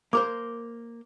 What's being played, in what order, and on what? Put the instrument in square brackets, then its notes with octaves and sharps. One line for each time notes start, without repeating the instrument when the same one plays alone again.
[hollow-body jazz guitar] A#3 A#4 C5 [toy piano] D6